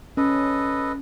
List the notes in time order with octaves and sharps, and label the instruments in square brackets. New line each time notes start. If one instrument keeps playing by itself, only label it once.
[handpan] C#4 [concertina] A4 B4 D#5